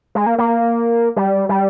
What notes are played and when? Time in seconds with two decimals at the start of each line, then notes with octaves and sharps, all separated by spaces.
0.15 G#3
0.26 A#3
0.38 A#3
1.16 G3
1.49 G3